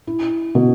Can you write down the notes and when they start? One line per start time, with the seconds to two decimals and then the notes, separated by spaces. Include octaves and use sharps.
0.07 E4
0.55 B2